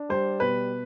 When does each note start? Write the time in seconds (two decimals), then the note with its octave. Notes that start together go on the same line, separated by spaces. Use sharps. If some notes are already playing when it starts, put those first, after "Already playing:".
Already playing: D4
0.09 G3 C5
0.40 B2 B4